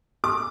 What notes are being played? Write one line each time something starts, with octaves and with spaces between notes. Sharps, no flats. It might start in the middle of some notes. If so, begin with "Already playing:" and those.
D6